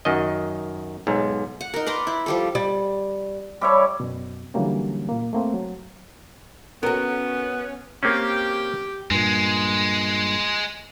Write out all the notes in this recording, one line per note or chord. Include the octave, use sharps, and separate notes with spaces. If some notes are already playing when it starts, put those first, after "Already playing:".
F#2 D#3 D#5
B1 G#2
F#5
D#4 A#4
B4 D5 A#5 C6
E4
F3 G3 A4
G3
G3 E4 C#5
F#2 B2
D3 E3 F#3 G3 A#3 C#4
A#2 A#3
A3 A#3 C4
F#3
B3 C#4 F#4 A#4
A#3 C4 C#4 G4 G5
G2 A#2 G#3